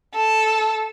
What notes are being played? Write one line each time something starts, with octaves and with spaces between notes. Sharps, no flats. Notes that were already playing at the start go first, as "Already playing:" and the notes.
A4